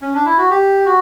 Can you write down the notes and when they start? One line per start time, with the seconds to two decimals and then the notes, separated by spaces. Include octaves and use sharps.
0.02 C#4
0.14 D4
0.26 E4
0.38 F#4
0.50 G4
0.86 F#4